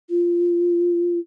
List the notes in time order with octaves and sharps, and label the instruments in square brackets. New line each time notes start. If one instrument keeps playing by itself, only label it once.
[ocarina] F4